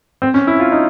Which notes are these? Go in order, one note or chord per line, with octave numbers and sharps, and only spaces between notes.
C4
C#4
E4
F4
D#4